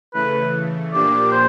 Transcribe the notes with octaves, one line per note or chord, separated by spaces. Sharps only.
C#3 E3 A3 B4
A#2 F3 A#3 D4 G4 D5
C5